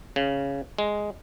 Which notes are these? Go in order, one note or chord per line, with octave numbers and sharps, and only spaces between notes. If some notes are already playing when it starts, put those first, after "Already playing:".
C#3
G#3